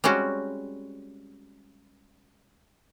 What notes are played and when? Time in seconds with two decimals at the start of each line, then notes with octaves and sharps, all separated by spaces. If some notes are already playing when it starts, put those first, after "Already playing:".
0.04 G3 G#3 C4 C#4 F#4